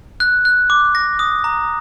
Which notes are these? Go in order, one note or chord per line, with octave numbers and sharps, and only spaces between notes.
F#6
F#6
D6
A#6
D#6
A#5